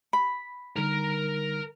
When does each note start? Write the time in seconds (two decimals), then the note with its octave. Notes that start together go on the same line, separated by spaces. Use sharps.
0.13 B5
0.76 D3 G3 D#4 A#4 A#5